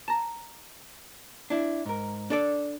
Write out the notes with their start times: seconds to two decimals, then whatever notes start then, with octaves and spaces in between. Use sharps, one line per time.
0.08 A5 A#5
1.50 D4 E4
1.86 G#2 A#4
2.30 D4 A4 D5